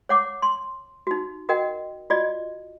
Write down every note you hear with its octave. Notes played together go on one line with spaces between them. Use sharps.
C#5 F#5 D6
C6
D#4 F#4
F#4 A#4 D#5 F#5 G5
F4 F#4 D5 D#5